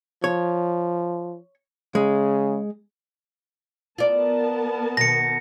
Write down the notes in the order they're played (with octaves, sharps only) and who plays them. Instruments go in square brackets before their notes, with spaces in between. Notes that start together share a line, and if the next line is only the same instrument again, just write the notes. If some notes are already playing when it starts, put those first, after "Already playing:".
[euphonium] F3 [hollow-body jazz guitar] C#5
[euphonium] C#3 [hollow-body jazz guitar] G#3
[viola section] B3 A#4 A5 [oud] F4 D5
[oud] B2 D#3 [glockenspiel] A#6 C#7